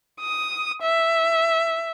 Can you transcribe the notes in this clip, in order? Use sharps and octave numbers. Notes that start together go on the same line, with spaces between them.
D#6
E5